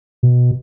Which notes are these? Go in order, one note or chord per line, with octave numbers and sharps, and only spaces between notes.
B2